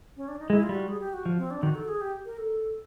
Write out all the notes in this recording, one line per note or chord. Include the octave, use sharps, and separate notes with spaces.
C#4
D4
D#4
G#3 E4
F4
G3
F#4
G#4
G4
F#4
F3
C4
D4
D#3 F#4
A4
G#4
G4
A#4
A4